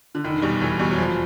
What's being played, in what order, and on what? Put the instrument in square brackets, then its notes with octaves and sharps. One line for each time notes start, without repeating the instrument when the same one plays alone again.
[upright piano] D3
[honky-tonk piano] F1 [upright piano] D#3
[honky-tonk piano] E2 B2 G3
[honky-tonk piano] F1 [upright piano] E3
[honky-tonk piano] E2 B2 G3
[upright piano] F#3
[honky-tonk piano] F1 [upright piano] F3